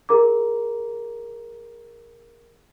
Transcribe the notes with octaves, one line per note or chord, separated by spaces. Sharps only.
G#4 A#4 A#5 D6